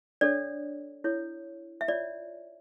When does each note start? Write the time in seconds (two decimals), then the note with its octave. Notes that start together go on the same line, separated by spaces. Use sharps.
0.21 D4 A4 C#5 D5
1.04 E4 A4 C#5
1.81 E5
1.88 F4 C#5 D5